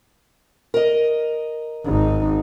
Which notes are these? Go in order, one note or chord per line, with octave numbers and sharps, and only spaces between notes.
A#4 D#5
G#1 D#4